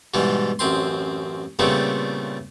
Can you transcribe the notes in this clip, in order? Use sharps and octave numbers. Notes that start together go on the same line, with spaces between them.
G#2 B2 E3 G3 G#3
A1 F#2 C4 C6
A#2 C#3 G3 A3 B3 C4